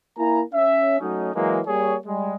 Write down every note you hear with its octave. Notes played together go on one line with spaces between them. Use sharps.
A#3 E4 G#5 A#5
C#4 E5
F#3 A3 C#4 D#4
E3 F#3 G#3 A#3
G3 A#3 G#4 C#5
G3 G#3